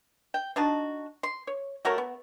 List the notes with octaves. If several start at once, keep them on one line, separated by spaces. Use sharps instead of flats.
G5
D4 D#4 F#4 A5
C6
C#5
A3 F#4 A#4 C#5
B3